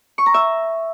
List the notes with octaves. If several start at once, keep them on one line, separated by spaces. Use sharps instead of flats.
C#6
A#5
E5